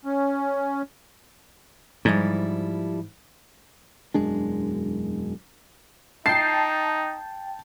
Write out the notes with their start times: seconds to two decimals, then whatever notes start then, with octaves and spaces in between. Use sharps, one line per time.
0.05 C#4
2.05 G#2 F3 G3 E4
4.14 E1 F#2 G#3 D4
6.26 D#4 G5 A5 C7